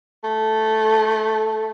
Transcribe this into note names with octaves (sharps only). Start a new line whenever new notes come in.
A3